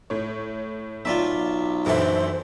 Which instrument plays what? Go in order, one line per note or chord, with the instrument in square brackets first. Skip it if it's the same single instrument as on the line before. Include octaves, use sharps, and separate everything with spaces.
[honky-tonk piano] A2 C#5
[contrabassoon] B1 [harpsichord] F4 D5 E5
[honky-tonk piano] A#1 A4 E5 [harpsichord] F#2 E3 [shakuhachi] C5